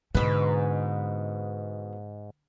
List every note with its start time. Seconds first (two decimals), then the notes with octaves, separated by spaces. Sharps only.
0.15 G#2 B2 D3 B4